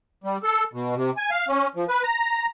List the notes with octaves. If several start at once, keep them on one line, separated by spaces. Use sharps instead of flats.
G3
A4
B2
C3
G#5
F5
C#4
F3
B4
A#5